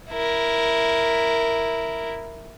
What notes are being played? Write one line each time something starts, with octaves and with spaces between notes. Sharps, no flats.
E4 A#4